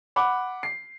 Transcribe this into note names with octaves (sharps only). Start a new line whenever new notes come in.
F#5 B5 D6
C7